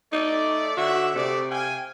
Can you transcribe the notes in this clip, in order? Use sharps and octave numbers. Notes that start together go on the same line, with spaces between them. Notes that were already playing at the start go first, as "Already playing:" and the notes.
A3 D#4 D5
D3 F#4 C#5 E5
C3 A3 G#4 D5
F5 G5 G#5